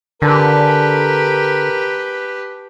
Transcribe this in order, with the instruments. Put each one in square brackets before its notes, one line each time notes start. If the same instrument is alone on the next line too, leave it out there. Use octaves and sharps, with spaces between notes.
[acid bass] D3 [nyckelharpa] G4 B4 [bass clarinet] A#4 [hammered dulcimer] G#5 A5 C6